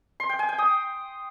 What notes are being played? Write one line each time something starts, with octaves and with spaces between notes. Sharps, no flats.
C6
G5
G#5
G5
D#6